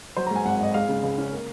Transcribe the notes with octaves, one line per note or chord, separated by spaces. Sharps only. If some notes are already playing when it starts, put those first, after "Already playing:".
F#3 C5
A#5
G#2 G#5
G#1 F#5
G#1 D#5
G#3 F5
C#3
C#2
C#4
A#3